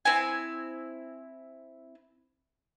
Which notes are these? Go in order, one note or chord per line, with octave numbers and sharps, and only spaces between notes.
C4 E4 G#5